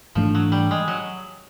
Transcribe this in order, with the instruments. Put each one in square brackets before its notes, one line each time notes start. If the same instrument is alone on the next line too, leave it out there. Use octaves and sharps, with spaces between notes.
[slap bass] G#2 E3 A3 D4 [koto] F3
[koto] F#3
G3
G#3
F#3